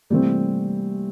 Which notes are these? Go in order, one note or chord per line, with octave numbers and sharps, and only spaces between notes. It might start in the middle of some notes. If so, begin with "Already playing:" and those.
C3 E3 G3 A3 A#3 C4